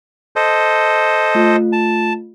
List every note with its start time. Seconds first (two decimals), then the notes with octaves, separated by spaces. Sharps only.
0.36 A4 C5 D#5
1.35 A3 F4
1.73 A5